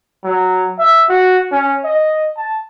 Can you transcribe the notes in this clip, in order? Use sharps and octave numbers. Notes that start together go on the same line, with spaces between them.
F#3
E5
F#4
C#4
D#5
A5